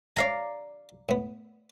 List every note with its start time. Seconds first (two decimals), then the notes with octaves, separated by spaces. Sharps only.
0.17 C#5 D5 E5 F5 G#5 A#5
1.09 A2 B3